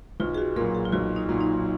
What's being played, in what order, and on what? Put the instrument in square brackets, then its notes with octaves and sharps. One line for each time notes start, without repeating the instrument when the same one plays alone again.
[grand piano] B1 [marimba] F4
[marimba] G#4
F#4
[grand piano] A#2 [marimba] A#4
[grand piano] F#3
[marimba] G#4
F4
[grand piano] B1 [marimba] F#4
[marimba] D#4
[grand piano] A#2 F#3
[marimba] D#4